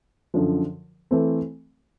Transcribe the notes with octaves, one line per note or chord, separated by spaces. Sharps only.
F#2 D3 F3
E3 A3 C4